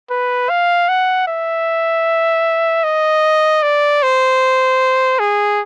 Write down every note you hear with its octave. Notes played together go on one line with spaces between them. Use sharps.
B4
F5
F#5
E5
D#5
D5
C5
G#4